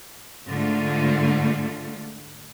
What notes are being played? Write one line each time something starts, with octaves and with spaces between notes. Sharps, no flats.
G#2 D3 A3 F4